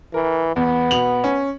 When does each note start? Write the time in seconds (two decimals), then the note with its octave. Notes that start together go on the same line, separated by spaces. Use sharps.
0.14 E3 A#4
0.56 E2 B3
0.91 B2 F7 F#7
1.24 C#4